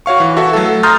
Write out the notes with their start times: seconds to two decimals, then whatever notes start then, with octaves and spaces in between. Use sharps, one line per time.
0.06 F#4 C#5 F5 C#6
0.20 E3
0.37 F#4 A4 E5
0.53 F#3 A3 A4
0.83 A#5 C6 D#6 F6 G6 A6